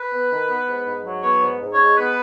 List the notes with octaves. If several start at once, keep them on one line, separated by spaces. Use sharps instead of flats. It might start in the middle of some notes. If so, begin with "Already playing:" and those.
Already playing: B4
B3
D#3
B3
G#2
G#2
F#3
B3 C#5
G#2
G#2
C#5
G#3
B3 B4